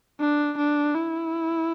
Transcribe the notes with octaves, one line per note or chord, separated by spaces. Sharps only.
D4
D4
E4